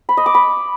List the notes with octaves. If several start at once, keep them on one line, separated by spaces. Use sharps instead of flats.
B5
D#5
D6
B5